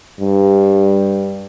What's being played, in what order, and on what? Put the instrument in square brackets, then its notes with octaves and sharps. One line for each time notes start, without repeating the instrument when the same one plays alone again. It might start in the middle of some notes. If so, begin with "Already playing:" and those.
[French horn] G2